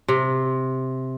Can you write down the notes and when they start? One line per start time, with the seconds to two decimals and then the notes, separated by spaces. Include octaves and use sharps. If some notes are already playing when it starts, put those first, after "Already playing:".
0.08 C3